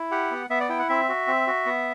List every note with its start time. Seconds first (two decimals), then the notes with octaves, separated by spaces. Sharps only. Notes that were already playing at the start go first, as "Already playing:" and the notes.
Already playing: E4
0.11 G4 F#5
0.31 B3
0.50 B3 E5
0.60 D5
0.69 E4 G5
0.79 F#5
0.89 C4 E5
1.09 F#4
1.28 C4
1.47 F#4
1.66 B3